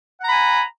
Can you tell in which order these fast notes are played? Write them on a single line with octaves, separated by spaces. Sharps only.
F#5 A#5 B5 G#5